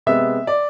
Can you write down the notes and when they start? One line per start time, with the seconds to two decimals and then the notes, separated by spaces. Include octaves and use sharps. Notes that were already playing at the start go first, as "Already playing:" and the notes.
0.06 C3 G#3 B3 E5
0.47 D5